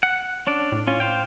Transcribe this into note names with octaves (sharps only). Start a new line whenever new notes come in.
F#5
C#4 D4 D5
A2
C#4 F4
C5 F5 G5